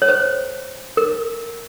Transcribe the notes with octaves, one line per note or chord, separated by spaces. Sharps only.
C#5
C5
A#4